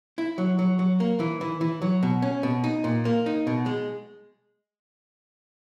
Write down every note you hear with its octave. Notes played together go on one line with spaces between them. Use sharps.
E4
F#3
F#3
F#3
A#3
E3
E3
E3
F#3
B2
C#4
B2
D#4
A#2
A#3
D#4
B2
G#3